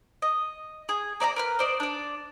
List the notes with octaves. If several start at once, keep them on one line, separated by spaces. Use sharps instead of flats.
D#5
G#4
A#3 D5 E5 A#5
A#4 B4 F6
C5 D5 D#5
D4 D5